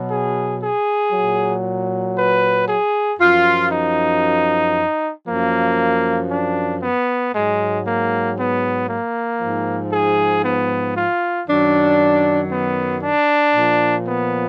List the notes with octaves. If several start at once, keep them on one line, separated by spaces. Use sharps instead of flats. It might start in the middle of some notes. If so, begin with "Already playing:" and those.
Already playing: B2 F#3
G#4
G#4
A#2 F#3
B4
G#4
F#2 F3 F4
D#4
F#2 F3 A#3
D4
B3
G#2 F#3 G#3
A#3
B3
A#3
G#2 F3
G#4
B3
F4
F#2 D#3 F#3 D4
B3
D4
A#2 F3
B3